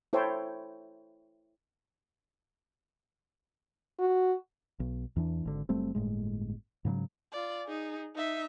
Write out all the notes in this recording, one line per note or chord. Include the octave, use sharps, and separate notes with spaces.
E4 A4 C5 C#5 G5
F#4
B1
E2 E3 D4
G#1 D3
F#1 G3 A3 C4
G1 A2 G#3
G#2 C#3 E3 F#3
F4 D5
D#4 G#4
D#4 E5